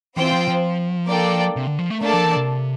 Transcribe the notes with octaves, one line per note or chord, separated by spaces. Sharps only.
E3 C4 F4 C5 G5
F3
F3
A#3 D4 A4 D5 G5
C3
D3
F3
A3
A3 A#3 D4 A4 D5 A5
F3
E3
C3